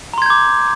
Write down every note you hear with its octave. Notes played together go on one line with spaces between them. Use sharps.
A#5 C6 D6 G6 G#6